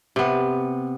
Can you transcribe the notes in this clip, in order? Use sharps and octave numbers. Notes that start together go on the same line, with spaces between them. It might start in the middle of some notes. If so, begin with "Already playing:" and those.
C3 B3